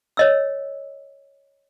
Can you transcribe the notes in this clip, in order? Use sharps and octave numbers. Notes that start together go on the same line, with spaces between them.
C#5 D#5 E6